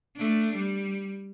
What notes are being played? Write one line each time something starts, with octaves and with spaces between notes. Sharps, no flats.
A3 D4
G3